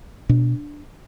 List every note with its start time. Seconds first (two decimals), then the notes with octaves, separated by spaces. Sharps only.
0.29 B2 D4